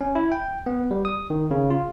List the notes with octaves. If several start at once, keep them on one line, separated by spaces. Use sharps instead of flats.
C#4
E4
G5
B3
G3
D#6
D#3
C#3
F4